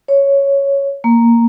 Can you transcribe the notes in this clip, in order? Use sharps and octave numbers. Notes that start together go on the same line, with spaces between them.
C#5
A#3